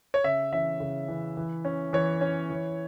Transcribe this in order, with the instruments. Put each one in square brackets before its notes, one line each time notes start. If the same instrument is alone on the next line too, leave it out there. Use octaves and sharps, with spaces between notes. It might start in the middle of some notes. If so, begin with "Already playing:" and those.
[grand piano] C#5
C#3 E5
E3 C#4 E5
C#3
E3 C#4
E3
C#4
E3 C#5
C#4
E3